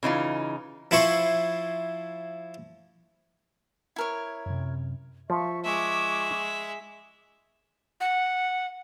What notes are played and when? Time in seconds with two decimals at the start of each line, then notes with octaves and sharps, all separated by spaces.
0.03 C#3 E3 D#4 F4
0.91 F3 E4 C5 C#6
3.96 E4 A#4 C#5
4.46 F#2 C3
5.30 F3 E5 C#6
5.65 G#3 E5 C#6 D6
8.01 F#5